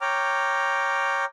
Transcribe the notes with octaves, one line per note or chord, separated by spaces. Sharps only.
C#5 G5 A#5 D6 F6